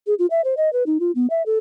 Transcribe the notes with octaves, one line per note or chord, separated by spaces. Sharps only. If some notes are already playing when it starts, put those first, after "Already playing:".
G#4
F4
E5
C5
D#5
B4
D#4
F4
B3
E5
A4